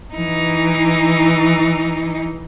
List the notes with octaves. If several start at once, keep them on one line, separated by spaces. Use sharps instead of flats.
E3 D#4